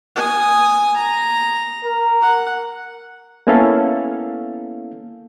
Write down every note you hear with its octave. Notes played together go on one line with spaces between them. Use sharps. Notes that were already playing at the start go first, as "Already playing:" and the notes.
G#5 D#6
A#5
A#4
F#5
A#3 B3 C#4 E4 A4 F5